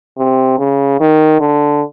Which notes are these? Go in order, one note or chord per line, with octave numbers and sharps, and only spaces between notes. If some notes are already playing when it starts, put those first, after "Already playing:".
C3
C#3
D#3
D3